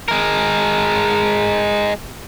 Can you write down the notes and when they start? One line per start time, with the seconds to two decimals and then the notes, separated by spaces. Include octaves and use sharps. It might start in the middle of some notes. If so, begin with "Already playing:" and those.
0.08 G#3 A#4